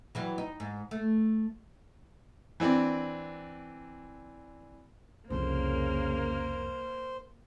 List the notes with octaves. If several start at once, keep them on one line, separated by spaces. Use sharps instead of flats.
E3 F#3 G3
D#4
G#2
A3
E3 C4 D4
C2 F2 C#3 A#3 A#4 C5